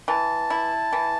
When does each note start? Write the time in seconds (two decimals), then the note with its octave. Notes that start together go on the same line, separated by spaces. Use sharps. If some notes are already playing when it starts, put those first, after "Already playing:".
0.08 E3 A5
0.50 E4
0.93 E3